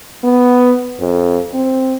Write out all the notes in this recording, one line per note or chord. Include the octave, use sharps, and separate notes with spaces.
B3
F2
C4